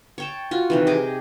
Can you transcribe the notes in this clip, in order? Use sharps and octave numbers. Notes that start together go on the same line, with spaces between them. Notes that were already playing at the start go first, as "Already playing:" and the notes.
C#5 G5 A5
F4 F#4
C3 D#3 E3
G4 G#4 D#5 D6